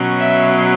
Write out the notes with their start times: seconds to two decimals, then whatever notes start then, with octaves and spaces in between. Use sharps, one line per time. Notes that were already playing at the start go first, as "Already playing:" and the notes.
Already playing: B2 F#3 C#4
0.18 E5